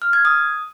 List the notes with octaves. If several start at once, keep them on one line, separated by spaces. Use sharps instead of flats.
F6
G#6
D#6